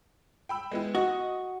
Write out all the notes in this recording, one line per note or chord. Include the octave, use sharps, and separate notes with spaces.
G5 B5 E6
G#3 B3 E4
F#4 D#5